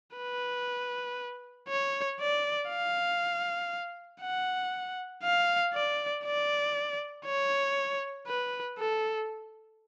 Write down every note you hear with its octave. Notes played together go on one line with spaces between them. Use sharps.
B4
C#5
D5
F5
F#5
F5
D5
D5
C#5
B4
A4